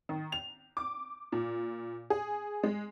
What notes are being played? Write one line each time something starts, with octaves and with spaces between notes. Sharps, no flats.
D#3
F7
D6
A#2
G#4
G#3